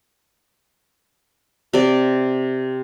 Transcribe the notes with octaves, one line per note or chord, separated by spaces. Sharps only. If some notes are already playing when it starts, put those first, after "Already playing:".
C3 D5